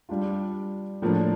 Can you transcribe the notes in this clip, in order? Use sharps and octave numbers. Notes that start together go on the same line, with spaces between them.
G3 D4 F4
A2 F3 A#3 D4